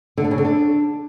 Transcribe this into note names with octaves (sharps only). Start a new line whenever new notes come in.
D3
D4
C#3
D3
D4